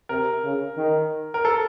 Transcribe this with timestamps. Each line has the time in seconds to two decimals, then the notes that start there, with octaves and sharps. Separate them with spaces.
0.09 C3 A#4
0.44 C#3
0.77 D#3
1.34 A#4
1.45 A4